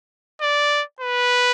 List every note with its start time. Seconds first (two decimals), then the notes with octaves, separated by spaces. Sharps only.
0.41 D5
1.00 B4